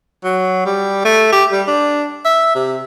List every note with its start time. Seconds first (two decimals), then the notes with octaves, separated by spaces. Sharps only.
0.24 F#3
0.66 G3
1.05 A3
1.32 G4
1.52 G3
1.67 D4
2.25 E5
2.55 C3